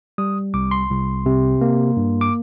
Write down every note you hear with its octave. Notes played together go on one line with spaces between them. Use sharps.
G3 D#6
C2 D6
C6
C2
C3
A#3
G2
D6